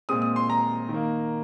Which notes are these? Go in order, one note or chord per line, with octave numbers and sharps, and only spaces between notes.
A#2 G#3 C4 D#6
D#6
C6
A#5
D#3
A#3